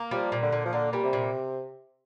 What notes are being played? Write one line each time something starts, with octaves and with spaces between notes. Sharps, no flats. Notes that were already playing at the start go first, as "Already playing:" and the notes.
Already playing: A#3
F3 G3
A#2
D3
A#2
F3
D3 A#3
A#2 G3
C3
A#2